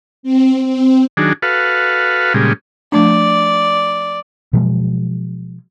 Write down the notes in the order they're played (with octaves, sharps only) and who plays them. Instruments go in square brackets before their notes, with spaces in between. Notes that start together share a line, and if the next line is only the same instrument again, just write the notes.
[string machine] C4
C4
[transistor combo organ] D#3 F#3 D4 G#4
F#4 A4 B4 F5
A#2 C#3 G3 G#3
[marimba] F3 A3 D4 [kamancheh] D5
[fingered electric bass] B2 F3 F#3 G#3